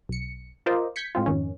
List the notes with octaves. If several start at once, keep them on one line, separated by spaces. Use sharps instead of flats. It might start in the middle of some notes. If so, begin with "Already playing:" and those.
B1 C#7
F4 A#4 C5 D5 D#5
G6 G#6 B6 C#7
A2 G#3 C4 F4
F2 G#2 D#3 C#4